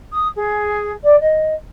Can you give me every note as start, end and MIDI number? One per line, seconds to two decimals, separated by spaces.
0.12 0.27 87
0.36 0.92 68
1.03 1.15 74
1.20 1.53 75